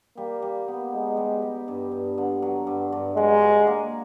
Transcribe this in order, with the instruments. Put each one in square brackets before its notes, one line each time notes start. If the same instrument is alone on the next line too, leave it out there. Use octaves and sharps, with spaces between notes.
[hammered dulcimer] G3 [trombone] A#3
[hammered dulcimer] G3
B3
[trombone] G#3 [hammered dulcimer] D#4
[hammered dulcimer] G3
G3
G2
G2
D3
F#3
G2
G2
[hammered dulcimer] F#3 [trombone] G#3
[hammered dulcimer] F#3
A#3